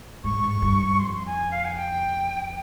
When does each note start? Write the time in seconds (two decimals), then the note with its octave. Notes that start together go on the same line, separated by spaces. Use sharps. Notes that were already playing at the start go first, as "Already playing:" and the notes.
0.24 G#2 C#6
0.44 G#2
0.55 F2
0.62 G2
0.82 G2
1.00 F2 C6
1.26 G#5
1.51 F5
1.65 G#5
1.77 G5